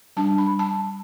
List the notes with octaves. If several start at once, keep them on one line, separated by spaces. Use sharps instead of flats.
G3 D4 A5
B5
A5